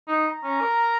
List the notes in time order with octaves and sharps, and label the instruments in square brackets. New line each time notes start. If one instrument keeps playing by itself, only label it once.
[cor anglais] D#4
[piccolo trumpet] A#5
[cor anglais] C#4
A#4